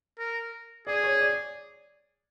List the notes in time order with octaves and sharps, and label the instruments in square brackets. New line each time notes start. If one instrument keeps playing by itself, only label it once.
[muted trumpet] A#4
[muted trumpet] G#4 [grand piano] D5
[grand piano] C#5
D5